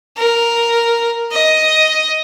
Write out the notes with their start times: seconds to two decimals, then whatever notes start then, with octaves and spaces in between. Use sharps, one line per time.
0.17 A#4
1.32 D#5